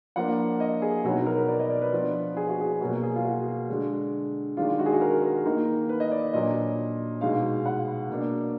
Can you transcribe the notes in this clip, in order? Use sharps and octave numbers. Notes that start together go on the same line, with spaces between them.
F3 A#3 D4 F#5
D#5
G#4
B2 F#3 B3 D#4 F#4
A#4
B4
D5
D#5
D5
B4
F3 B3 D4
G#4
F#4
G#4
B2 F#3 A#3 F#4
G#4
F4
F#4
D3 G#3 D4
D#3 G#3 D4 F4
F#4
G#4
F#4
A#4
A#4
D#3 A#3 D#4
B4
D#5
D5
A#2 F#3 D4 D#5
B2 G#3 D#4 F5
F#5
B2 A#3 D4